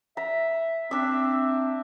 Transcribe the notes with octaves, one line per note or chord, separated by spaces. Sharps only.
E5 A#5
C4 D4 E5